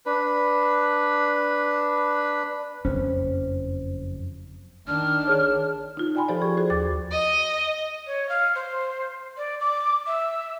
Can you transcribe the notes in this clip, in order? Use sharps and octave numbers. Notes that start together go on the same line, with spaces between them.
D4 B4
F#1 F2 C#4 C5
D#3 D4 F6
G#4 C#5
D#4 F4
F4 D5 G5 G#5 B5 C6
F3 G4 A4 C5 D5
G#4 D5 C#6
F#4 G#4 C5
D#2 D6 A6
D#5
C#5
F5
C5
D5
D6
E5